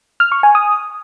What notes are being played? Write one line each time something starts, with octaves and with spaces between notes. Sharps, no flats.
F6
C#6
G#5
D#6